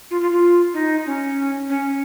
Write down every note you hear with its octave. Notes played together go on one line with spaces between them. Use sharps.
F4
F4
F4
D#4
C#4
C#4